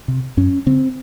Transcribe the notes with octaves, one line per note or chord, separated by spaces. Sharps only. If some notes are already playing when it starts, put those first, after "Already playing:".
C3
F#2 C#4
C#3 C4